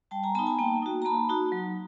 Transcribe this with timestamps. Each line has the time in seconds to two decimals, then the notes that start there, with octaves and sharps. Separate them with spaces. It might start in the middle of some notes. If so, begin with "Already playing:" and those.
0.11 G3 G5 A5
0.23 G#5 A#5
0.35 B3 D#4 A5 B5
0.47 G#5 A#5
0.59 A#3 G5 A5
0.82 D#4 F#4
1.02 A#5
1.05 A#3 A5 B5
1.29 D#4 F#4
1.52 F#3